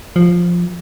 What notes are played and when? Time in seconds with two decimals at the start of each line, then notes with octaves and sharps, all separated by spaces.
0.16 F3